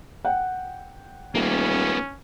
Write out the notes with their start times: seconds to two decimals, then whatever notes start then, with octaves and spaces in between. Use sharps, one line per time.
0.25 F#5 G5
1.35 D#1 A#3 B3 C#4